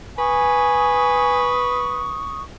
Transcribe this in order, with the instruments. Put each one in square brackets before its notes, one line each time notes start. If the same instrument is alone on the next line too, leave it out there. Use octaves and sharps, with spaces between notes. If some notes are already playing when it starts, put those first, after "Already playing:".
[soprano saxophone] B4 [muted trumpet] G#5 [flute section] C#6 D#6